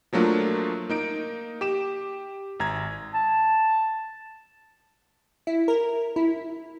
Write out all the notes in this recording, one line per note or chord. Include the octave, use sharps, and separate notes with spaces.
F3 F#3 A3 A#3 D4 F4
A#3 D#4 D7
G4 D6 E7
G#1 A#5 G#6
A5
E4
A#4
E4